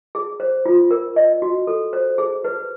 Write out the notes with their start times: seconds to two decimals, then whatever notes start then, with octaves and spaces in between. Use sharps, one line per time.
0.15 G#4
0.40 C5
0.66 F4
0.91 A#4
1.16 D#5
1.42 F#4
1.67 A4
1.93 C5
2.18 G#4
2.44 B4